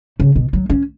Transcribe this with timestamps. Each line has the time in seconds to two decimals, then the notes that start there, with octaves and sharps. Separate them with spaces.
0.20 C#3
0.36 B2
0.53 F#3
0.70 C#4